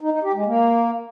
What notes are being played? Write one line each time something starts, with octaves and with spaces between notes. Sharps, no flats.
D#4
D#4
G4
G#3
A#3